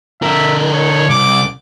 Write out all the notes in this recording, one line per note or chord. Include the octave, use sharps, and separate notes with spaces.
D3 A#4 E5
C#5
C2 D6